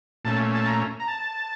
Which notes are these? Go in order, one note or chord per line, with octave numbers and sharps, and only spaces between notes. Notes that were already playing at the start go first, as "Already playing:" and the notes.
A#2 A3 C#4 A5
A5
A#5
A#5
A5